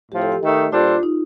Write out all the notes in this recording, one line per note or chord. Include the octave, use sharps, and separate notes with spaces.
A2 F3 C4 G4
A4
G4
D#3 A3 D#4
A#2 G3 D4 F4 A4 C5
F4
D#4